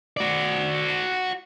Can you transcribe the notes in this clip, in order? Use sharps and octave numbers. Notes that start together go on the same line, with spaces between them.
F#4 D5